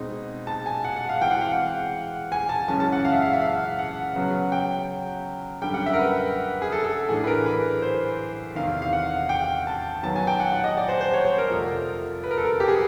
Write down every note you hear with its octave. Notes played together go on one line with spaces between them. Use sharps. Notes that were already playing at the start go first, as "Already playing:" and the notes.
Already playing: B2 G#3 C4 D#4
A5
G#5
F#5
F#5
F5
E3 G#3 C4 G5
F#5
F5
F#5
G#5
A5
F#2 C#3 E3 G#3 C#4 A5
A5
F#5
F5
E5
F5
E5
F5
F#5
C#3 F#3 B3
G5
F#2 D3 G3 G5
F#5
E5
A#4
B4
G#4
A4
A4
A2 E3 A3 D4 G#4
B4
A#4
B4
C5
E2 C3 D#3 F5
F5
F#5
G5
A5
D#3 F#3 B3 A5
G#5
G5
F#5
F#5
D#5
D5
C5
C5
C#5
C5
A#4
F2 C3 F3 A3
B4
A#4
A4
A#4
G4
G#4